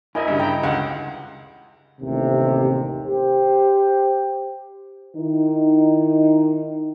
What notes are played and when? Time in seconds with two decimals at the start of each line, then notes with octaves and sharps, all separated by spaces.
0.15 E4 A#4 D#5 E5 G#5
0.28 G2 C#3
0.40 G5 A#5
0.64 C#2 F5 F#5
2.01 A1 D#2 C3
3.04 G4 C5
5.17 D#3 D#4 E4